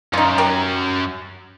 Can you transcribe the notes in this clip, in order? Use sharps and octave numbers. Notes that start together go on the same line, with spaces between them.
F#2 D#4 F4
G4 A#4